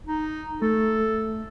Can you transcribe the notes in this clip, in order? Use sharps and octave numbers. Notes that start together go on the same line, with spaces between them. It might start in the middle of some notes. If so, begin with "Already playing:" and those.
D#4
A3 A4